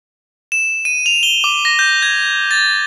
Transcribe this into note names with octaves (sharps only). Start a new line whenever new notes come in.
E7
D#7
F7
G7
D6
A#6
G6
G#6
A6